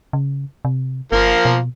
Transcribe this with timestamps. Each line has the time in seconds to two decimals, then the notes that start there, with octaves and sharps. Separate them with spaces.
0.13 C#3
0.65 C3
1.12 G1 F3 A#3 A#4
1.45 B2